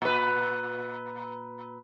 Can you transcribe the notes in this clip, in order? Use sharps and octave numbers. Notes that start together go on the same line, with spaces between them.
A#2 B4